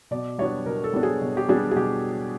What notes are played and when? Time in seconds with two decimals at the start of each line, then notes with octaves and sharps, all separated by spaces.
0.11 B2 D5
0.38 G3 B3 D4 C#5
0.65 B2 A#4
0.84 A4
0.93 G3 B3 D4
1.03 G#4
1.21 B2
1.37 G4
1.48 G3 B3 D4 G#4
1.71 G#4
1.76 B2 G4